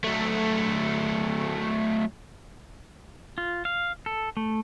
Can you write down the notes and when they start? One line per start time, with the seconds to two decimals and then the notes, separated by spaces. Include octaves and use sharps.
0.04 F#3 A3
3.38 F4
3.65 F5
4.06 A4
4.37 A3